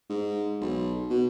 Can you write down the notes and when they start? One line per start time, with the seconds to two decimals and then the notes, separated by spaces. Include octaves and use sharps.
0.10 G#2
0.61 B1
1.10 B2